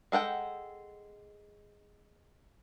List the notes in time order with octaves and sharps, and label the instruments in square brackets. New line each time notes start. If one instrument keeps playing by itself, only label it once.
[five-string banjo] G#3 A4 F#5 G5